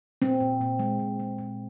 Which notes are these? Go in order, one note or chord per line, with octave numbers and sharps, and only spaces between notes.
A#2 C4
A#2
A#2
G#3
A#2
G#3
A#2